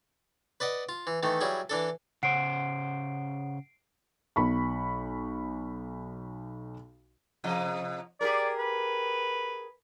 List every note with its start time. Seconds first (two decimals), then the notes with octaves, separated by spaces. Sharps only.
0.60 B4 D5 D#5 F#5
0.89 F4
1.07 E3
1.23 D#3 E3 A3
1.41 F#3 G3 E4 G#4
1.70 E3 D4 A4
2.23 C#3 C#4 C5 F#5 C7 D7
4.36 B1 B5 C#6
7.44 C3 F3 D#5
8.21 G4 G#4 A#4 D5
8.58 B4